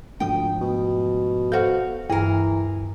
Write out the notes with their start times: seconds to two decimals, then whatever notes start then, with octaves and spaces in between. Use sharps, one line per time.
0.20 D2 G#2 F3 A3 G5 D#6
0.61 B2
1.52 F#4 A4 C5 F5 F#5
2.10 D1 G2 E3 G#4 A#4